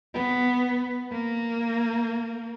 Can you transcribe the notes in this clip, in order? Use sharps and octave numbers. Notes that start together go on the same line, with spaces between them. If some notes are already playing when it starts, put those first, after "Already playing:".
B3
A#3